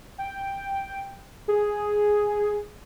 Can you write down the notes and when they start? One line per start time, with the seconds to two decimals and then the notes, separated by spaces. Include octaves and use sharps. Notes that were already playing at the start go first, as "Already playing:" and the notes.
0.18 G5
1.48 G#4